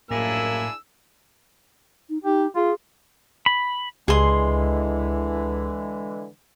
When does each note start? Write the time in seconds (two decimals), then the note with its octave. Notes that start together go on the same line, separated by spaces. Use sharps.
0.11 A#1 F#2 A2 A#3 D4 E4 G#4 E6
2.10 D#4
2.24 D#4 G4
2.56 F4 G#4
3.46 B5
4.08 C#2 D3 E3 G#3 G#4 C6